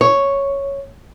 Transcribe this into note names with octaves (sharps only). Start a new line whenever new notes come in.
C#5